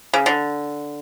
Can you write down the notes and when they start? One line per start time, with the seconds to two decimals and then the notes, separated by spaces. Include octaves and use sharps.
0.13 C#3
0.26 D3